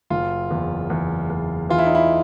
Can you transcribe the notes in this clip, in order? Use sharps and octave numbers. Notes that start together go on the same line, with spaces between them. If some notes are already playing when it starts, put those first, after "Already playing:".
F#1 F4
E2
E2
E2
E3 F4
E4
D#4
E4